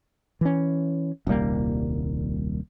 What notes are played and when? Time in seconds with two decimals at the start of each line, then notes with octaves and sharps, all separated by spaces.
0.41 E3 C#4
1.27 D#1 C2 G3 A#3